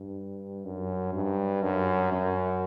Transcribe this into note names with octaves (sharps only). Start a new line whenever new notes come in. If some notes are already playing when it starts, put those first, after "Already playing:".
Already playing: G2
F#2
G2
F#2
F#2